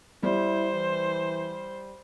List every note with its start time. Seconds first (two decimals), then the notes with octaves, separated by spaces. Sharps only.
0.23 G3 E4 C5
0.75 E3